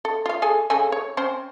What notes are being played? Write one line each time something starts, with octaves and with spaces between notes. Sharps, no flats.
A4
F4 F5
G#4 A4 G#5
C#3 A4 G#5
C#5
C4 C#4 C5